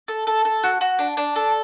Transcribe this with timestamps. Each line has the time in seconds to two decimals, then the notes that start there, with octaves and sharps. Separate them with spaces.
0.08 A4
0.27 A4
0.45 A4
0.63 F#4
0.81 F#4
0.99 D4
1.17 D4
1.36 A4